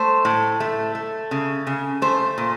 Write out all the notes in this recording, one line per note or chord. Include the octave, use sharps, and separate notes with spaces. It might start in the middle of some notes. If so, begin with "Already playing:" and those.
Already playing: A3 C5
A2
A3
A3
C#3
C#3
A3 C5
A#2